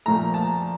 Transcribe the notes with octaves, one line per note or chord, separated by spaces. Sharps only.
A#2 F3 A3 A#5
A5